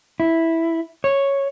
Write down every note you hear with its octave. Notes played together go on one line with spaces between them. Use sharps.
E4
C#5